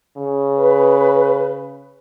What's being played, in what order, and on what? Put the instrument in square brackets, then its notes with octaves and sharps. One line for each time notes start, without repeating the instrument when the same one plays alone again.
[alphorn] C#3
[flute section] B4